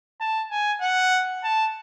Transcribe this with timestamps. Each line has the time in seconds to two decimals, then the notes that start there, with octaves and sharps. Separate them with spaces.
0.20 A5
0.51 G#5
0.81 F#5
1.44 A5